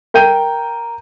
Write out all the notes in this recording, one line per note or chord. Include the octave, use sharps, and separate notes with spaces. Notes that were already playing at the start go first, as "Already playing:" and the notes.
A#4 G5 G6 D#7